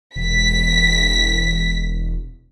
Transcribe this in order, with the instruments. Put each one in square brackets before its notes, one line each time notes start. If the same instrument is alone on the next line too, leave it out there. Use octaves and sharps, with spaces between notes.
[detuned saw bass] E1 [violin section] B6